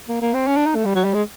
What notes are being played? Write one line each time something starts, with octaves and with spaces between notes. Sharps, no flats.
A#3
A#3
C4
C#4
D4
D#4
A3
G3
F#3
G3
G#3